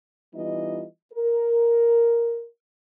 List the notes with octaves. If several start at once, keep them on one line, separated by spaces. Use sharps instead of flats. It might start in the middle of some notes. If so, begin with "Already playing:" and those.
E3 G3 B3 D#4 F4 D#5
A#4